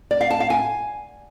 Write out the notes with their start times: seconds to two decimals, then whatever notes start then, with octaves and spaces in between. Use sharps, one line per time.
0.11 D5
0.21 F5
0.30 A5
0.40 F5
0.50 G#5